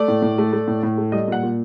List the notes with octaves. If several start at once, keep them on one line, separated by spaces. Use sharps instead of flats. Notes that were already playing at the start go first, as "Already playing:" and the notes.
Already playing: A3 D5
A2
A2
A3
A3
A2
A2
A3
G3 D#5
A#2 F#5
A#2